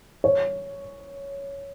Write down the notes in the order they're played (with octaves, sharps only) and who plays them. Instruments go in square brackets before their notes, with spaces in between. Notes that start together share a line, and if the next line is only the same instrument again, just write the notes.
[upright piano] C#5